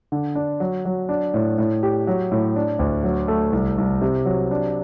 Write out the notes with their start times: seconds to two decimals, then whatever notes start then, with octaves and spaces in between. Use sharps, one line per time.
0.12 D3
0.35 D4
0.60 F#3
0.85 F#3
1.09 D4
1.34 A2
1.58 A2
1.83 G4
2.07 F#3
2.32 A2
2.56 D4
2.79 D2
3.04 F#3
3.28 A3
3.52 C2
3.78 C2
4.02 C3
4.26 F#3
4.51 D4